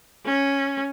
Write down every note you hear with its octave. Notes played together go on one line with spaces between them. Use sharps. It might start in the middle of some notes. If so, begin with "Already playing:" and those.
C#4